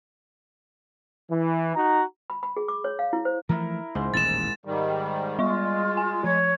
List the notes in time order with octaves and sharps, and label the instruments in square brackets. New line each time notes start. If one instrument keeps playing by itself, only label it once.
[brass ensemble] E3
D#4 F#4 A#5
[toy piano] B5
B5
G#4
D6
C#5
F5
E4
C5
[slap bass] E3 F3 A3 [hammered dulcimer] E4 A#4
[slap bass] C#2 [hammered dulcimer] G#2 C5 C6
[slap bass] D#1 A1 D#2 [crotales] A6 E7
[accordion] G#2 D#3 G3
[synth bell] G3 D5 C#6 [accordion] G#3 [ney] F4
[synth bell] G#5
[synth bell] F3 [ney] C#5